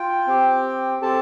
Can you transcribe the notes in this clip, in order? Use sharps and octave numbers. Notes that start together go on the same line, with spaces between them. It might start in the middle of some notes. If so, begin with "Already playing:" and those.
Already playing: F4 G5
C4 G4
C4 G4 A4 A5